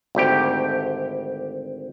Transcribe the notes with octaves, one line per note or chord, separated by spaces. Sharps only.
G#1 D2 G4 G5